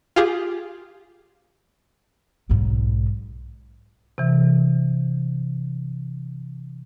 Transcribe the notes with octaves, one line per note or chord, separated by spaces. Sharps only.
F4 G4 G#4
B1 G#2
C3 E3